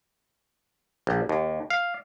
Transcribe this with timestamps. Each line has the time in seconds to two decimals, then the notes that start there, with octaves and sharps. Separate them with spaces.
1.07 A#1
1.29 D#2
1.70 F5